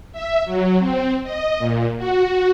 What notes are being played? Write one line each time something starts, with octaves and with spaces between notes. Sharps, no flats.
E5
F#3
C4
D#5
A#2
F#4